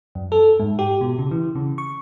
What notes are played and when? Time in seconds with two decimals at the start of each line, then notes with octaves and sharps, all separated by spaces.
0.15 F#2
0.32 A4
0.60 G#2
0.79 G4
1.01 B2
1.19 C#3
1.31 E3
1.55 C#3
1.78 C#6